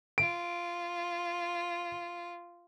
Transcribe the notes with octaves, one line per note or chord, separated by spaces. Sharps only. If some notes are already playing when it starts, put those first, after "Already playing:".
F4 D7